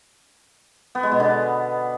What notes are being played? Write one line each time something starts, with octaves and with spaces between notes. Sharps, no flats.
B3
G#3
B2
D3